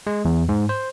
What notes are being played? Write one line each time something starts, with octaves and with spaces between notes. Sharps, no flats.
G#3
E2
G#2
C5